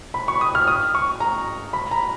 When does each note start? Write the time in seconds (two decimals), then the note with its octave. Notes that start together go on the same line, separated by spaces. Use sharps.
0.14 B5
0.28 C#6
0.41 D#6
0.55 F6
0.67 D#6
0.95 C#6
1.20 A#5
1.73 B5
1.91 A#5